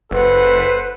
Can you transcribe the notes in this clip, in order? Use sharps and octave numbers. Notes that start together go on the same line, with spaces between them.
F#1 A4 B4 C5 F#5